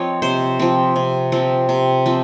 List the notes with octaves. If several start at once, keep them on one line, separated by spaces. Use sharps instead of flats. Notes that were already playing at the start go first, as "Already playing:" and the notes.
Already playing: F3 C4 C#5 D#5
C3 C5
F3 C4
C3
F3 C4
C3
F3 C4